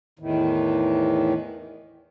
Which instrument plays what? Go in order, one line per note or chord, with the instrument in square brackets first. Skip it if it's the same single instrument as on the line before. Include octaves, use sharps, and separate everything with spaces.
[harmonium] E2 A2 D#3 E3